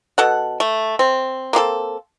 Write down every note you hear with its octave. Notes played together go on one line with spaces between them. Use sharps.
B2 A4 F#5
A3
C4
A#3 C4 G4 A4